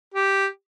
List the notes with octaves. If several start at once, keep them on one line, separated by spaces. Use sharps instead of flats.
G4